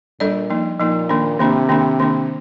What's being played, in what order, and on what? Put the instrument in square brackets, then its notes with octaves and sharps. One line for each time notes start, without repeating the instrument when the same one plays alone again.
[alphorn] A#2 [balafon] G3 D4 A4 D5
[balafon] F3 A#3 D#4
[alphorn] A#2 [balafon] F3 A#3 D#4
[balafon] D#3 A#3 D4
[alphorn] C3 [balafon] D#3 A#3 D4
[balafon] D#3 A#3 D4
D#3 A#3 D4